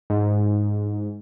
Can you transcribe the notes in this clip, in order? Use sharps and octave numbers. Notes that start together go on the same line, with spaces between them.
G#2